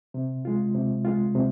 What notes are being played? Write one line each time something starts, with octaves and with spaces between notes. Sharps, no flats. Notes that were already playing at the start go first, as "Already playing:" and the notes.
C3
G#3 F4
C3
G#3 F4
C3